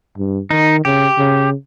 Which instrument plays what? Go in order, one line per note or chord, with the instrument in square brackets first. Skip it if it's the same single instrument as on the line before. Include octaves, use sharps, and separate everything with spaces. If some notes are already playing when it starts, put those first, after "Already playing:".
[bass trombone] G2
[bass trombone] D#3 [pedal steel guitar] D#4
[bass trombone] C#3 [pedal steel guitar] G4
[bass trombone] C#3